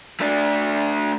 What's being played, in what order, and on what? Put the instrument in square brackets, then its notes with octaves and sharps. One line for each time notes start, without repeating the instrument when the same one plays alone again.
[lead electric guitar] A3 D4